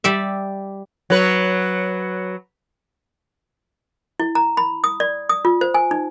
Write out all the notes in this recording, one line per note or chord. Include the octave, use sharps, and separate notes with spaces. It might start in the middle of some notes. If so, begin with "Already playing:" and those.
G3 D5 E5
F#3 B4
E4
A#5
B5
D#6
D5
D#6
F4
C5
G#5
D#4